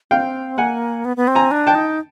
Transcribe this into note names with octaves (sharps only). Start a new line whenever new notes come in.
C4 F5 G5
A#3 F#5 G#5
B3
B3
C4
G#5 A#5
D4
G5 A5
D#4